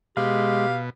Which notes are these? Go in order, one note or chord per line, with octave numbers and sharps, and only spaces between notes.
B2 G#3 G4 F5